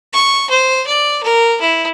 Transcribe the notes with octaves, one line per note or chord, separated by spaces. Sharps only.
C#6
C5
D5
A#4
E4